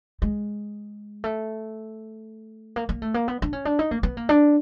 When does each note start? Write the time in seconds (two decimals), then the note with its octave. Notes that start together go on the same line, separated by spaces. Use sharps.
0.22 G#3
1.24 A3
2.76 A#3
2.89 A#3
3.02 A3
3.14 A#3
3.28 B3
3.42 D4
3.53 C#4
3.65 D4
3.79 D#4
3.91 A#3
4.03 B3
4.17 A#3
4.29 D4